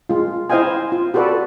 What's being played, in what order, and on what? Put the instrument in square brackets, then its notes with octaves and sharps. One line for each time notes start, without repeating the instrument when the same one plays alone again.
[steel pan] G#3 F4
E4 C5 D#5 F5 G5 G#5
F4
F#4 G4 A4 B4 D5